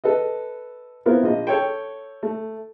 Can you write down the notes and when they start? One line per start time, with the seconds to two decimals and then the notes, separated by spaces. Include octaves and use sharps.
0.04 A4 B4 D#5
1.06 B3 C4 E4 F4 A#4
1.23 A#1 F4 D#5
1.47 A4 C#5 G5
2.23 A3